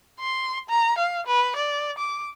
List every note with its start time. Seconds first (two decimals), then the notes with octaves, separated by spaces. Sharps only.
0.20 C6
0.69 A#5
0.98 F5
1.27 B4
1.56 D5
1.98 D6